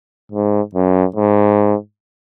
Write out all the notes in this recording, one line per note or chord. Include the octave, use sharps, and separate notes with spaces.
G#2
F#2
G#2